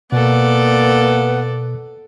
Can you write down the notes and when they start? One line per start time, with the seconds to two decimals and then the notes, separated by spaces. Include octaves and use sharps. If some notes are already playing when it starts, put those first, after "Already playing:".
0.12 B2 A#3 B3 A4 D5